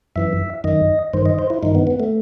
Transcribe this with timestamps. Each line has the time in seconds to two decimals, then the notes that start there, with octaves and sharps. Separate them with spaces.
0.16 F#2 E3 E5
0.64 F#2 D#3 D#5
1.13 G2 D#3 C5
1.26 D#5
1.39 C5
1.50 E4
1.63 G2 D#3 D#4
1.75 B3
1.87 B3
2.00 A3